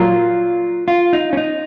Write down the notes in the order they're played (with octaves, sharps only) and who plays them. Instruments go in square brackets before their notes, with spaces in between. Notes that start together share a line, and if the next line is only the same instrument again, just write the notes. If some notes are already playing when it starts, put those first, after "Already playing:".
Already playing: [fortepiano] A#2 F#3 A#3 [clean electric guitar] F4
[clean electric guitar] F4
D#4
C#4
D#4